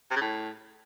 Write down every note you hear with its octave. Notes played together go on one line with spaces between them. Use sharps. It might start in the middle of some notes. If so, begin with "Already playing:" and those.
C3
C#3
A2